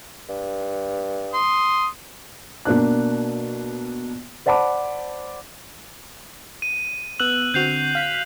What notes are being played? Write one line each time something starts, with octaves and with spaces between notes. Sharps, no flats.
G2
C6 D#6
B2 A#3 D4 F#6
C5 D5 F#5 A5 B5 D6
D#7
B3 E6 F#6 F#7
D3 C4 F#4 G6 C7 F7
F5 B6